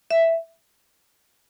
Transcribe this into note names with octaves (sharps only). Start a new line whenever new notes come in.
E5